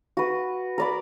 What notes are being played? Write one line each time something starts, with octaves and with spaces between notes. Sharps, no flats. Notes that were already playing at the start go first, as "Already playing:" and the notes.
F#4 B4
A#4 D5 B5